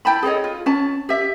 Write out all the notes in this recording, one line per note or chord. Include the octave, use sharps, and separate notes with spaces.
E4 G5 A5 B5
G#4 A4 C#5 D#5
F4
C#4 A5
G4 E5